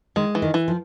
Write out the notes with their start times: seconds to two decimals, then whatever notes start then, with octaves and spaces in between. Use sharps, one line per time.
0.16 D#3 G#3
0.35 E3
0.42 D#3
0.54 E3
0.68 F3